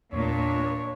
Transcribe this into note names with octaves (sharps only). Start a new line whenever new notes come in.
E2 A#2 D4 C#5